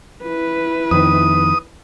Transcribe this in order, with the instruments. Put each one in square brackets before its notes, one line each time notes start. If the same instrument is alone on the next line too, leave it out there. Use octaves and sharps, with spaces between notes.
[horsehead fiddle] E4 B4
[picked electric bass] F2 D#3 [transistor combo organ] D#6